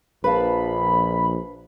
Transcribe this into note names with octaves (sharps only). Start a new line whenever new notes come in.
A#1 B4 F5 A5 B5